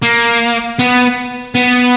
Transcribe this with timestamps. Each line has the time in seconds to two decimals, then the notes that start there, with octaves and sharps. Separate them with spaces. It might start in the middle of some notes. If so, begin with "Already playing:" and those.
0.02 A#3
0.79 B3
1.55 B3